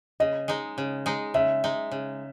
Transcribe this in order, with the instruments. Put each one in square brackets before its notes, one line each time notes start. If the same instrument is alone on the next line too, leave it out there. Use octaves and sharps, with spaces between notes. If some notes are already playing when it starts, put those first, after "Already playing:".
[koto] C#3 [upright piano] D#5
[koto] G#3 D#4
C#3
G#3 D#4
[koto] C#3 [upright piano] E5
[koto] G#3 D#4
C#3